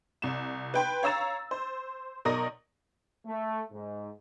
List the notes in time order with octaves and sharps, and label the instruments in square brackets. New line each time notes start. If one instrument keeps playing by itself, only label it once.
[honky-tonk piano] C2 E7
B4 G5 C6
C#5 F5 A#5 E6 A6 E7
C5
B1 A#4 D5 D#6 A#6
[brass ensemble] A3
G#2